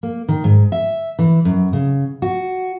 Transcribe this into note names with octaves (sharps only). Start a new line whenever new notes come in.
A#3
D#3
G#2
E5
E3
F#2
C#3
F#4